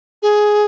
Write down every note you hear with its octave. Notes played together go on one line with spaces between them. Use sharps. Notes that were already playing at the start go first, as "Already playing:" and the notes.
G#4